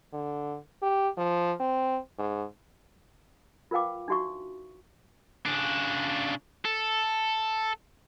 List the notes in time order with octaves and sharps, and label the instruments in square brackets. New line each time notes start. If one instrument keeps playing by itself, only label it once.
[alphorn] D3
G4
F3
C4
G#2
[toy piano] F4 A#4 B4 F5 G5 D6
D4 D#4 F#4 E5 C#6
[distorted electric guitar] C#3 D4
A4